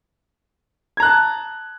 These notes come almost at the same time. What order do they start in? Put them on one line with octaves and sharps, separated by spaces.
G#6 A#5 F#6 A5